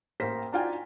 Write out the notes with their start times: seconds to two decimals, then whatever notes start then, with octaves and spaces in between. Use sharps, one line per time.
0.20 A1 A#3 A#4 C5 A#6 B6
0.53 D4 D#4 F4 F#4 G5 G#5